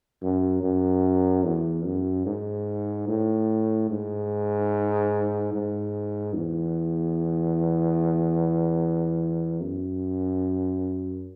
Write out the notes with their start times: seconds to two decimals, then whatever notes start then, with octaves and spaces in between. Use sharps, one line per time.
0.22 F#2
0.63 F#2
1.45 E2
1.86 F#2
2.26 G#2
3.08 A2
3.90 G#2
5.53 G#2
6.34 E2
9.61 F#2